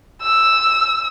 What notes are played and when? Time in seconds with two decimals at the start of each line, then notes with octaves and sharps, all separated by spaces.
0.22 E6